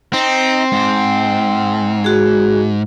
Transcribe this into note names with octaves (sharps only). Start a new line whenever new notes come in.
C4 D#4
G#2
F#4 G#4